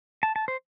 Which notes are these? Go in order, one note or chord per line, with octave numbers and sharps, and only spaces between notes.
A5
A5
C5